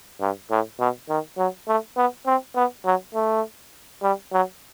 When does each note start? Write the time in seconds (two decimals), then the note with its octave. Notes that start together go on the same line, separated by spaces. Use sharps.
0.21 G2
0.51 A2
0.80 B2
1.09 D#3
1.38 F#3
1.68 A3
1.97 B3
2.26 C4
2.56 B3
2.85 F#3
3.15 A3
4.03 G3
4.33 F#3